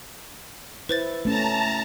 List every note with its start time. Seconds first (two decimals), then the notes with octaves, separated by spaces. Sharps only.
0.89 E4 B4 C5 A6
1.25 A3 C#4 A5 A#5